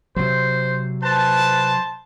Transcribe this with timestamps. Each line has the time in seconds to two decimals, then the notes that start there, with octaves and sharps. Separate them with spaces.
0.16 C3 F#3 C5
1.03 B4 C5 A5